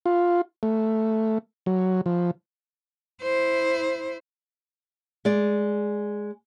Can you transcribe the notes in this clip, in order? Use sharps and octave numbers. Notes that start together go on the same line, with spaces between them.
F4
A3
F#3
F3
E4 C5
G#3 D5